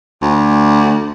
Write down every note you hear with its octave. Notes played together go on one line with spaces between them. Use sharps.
D2